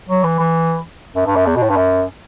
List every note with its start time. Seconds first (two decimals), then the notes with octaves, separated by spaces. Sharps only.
0.09 F#3
0.24 E3
0.39 E3
1.16 F#2
1.26 G2
1.36 F#2
1.46 E2
1.56 B2
1.62 A2
1.69 G2
1.77 F#2